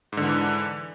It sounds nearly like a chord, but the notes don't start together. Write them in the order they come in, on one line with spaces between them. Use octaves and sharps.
G#2 D3 E3